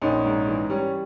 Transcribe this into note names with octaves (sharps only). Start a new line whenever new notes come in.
A#1 C#4 D#4
G#2
E3
G3 C#4